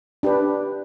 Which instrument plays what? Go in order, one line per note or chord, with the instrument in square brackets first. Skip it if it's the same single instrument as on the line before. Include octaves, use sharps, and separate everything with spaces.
[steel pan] D4 G4 B4